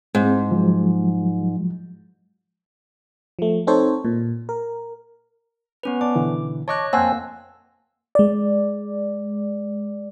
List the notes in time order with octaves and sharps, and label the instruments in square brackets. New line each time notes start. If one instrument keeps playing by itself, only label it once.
[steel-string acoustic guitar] G#2 [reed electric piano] C4 G#4
[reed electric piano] F3 F#3 G#3
[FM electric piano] F3 A3
C4 D#4 A4 C5 C#5
A#2
A#4
[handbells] B3 C#4 B4
[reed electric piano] B3 D5 A5 [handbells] D6
[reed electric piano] B2 D3 E3
[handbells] C#5 D#5 F#6 [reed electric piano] A5 C#6 D6
[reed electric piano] F2 A5 [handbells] A#3 E6 [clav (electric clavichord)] C4 F#5 G#5
[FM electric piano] G#3 D5